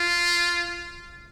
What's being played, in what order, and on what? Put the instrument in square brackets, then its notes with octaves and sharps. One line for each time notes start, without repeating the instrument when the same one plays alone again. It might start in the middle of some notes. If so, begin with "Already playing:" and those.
Already playing: [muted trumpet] F4